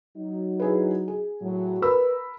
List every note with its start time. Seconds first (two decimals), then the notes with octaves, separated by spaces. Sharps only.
0.17 F#3 D#4
0.60 E4 G#4 B4
1.08 G#4
1.42 A2 F#3
1.82 A#4 B4 B5 E6